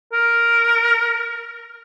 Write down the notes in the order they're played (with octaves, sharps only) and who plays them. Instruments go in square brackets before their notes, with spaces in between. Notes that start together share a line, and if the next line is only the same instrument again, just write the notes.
[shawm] A#4